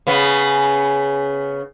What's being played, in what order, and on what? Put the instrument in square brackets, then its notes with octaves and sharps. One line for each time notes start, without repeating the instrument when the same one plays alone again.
[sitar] C#3 B3